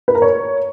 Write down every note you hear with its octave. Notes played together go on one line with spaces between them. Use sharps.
B4
A#4
C#5